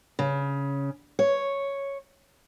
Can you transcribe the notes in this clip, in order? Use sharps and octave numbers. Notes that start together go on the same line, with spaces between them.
C#3
C#5